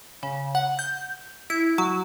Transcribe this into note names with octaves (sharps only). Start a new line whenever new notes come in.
C#3
F#5
G6
E4
F#3